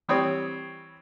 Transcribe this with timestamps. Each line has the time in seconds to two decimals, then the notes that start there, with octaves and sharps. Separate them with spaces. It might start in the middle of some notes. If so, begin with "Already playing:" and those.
0.09 E3 G3 C4 C#5 D#6